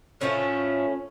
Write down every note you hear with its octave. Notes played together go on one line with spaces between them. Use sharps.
A2 F3 A3 C#4